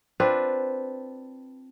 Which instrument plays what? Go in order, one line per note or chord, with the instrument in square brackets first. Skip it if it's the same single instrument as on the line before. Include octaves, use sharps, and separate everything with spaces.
[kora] C4 D4 F4 B4